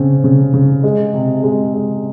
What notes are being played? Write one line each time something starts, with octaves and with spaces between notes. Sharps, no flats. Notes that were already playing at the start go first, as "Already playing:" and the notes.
Already playing: C#3 C4
C#3
C#3
G#3
C3
G#3
G#3